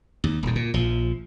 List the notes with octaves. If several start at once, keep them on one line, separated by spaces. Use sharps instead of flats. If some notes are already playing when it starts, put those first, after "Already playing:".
D#2
D#1 A2
A#2
A#1 F3